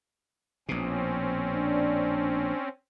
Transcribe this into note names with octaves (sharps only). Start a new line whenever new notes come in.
A#1 B2 C4 C#4
D4